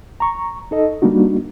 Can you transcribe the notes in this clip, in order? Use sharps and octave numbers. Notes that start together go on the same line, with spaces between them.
A#5 C#6
D#4 A4 D#5
G3 A#3 D4 D#4 F#4